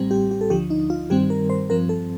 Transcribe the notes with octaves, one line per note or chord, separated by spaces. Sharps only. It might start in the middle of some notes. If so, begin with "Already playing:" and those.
Already playing: A1 A2 G3 C4
G4
G4
A4
D2 D3 F3 G4
D#4
F4
G2 D#3 G3 C4 G4
A#4
C5
G2 F3 C4 A#4
A4